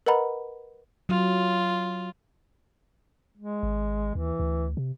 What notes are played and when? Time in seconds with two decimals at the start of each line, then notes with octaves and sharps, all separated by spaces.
0.06 A#4 B4 D#5 F#5 A#5 B5
1.09 F#3 F4
3.37 G#3
3.63 G#1
4.15 D#2 E3
4.39 D2
4.77 C3